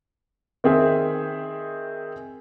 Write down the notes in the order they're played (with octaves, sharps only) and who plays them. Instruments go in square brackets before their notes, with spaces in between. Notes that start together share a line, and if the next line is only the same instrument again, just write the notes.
[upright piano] D#3 C4 G#4 E5